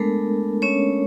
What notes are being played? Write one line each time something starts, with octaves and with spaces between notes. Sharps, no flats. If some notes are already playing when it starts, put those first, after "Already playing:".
Already playing: G#3 A3 B3 D4 A4 A#4
C#4 C#5